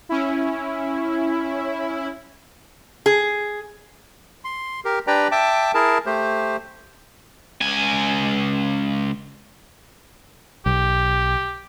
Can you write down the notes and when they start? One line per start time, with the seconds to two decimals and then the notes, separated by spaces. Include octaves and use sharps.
0.09 C#4 E4
3.06 G#4
4.45 C6
4.85 G4 A#4
5.07 D4 G4 B4 D5 G5 A#5
5.32 E5 G5 A5 D6
5.74 E4 G#4 A#4 A5
6.06 A3 G4 C5
7.61 C#2 G#5
10.66 B1 G4